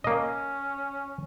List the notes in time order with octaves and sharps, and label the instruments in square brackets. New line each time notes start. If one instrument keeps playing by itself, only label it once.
[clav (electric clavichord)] A#3 D#5 [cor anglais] C#4